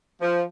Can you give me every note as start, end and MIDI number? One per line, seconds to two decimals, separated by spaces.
0.21 0.42 53